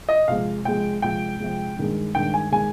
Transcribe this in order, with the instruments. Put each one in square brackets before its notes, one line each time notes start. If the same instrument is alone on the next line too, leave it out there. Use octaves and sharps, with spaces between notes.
[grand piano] D#5
[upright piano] C3 F3 G#3 [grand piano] F5
[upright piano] C3 F3 G#3 [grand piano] G5
[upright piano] C3 F3 G#3 [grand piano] G5
[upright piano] C3 F3 G#3
G2 D#3 G#3
[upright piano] G2 D#3 G#3 [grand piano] G5
[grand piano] G#5
[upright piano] D#3 G#3 [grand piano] G#5